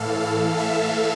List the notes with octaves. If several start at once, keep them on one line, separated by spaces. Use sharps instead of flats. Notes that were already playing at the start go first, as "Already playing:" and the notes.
Already playing: A2 E3 A4 F5
F5
E5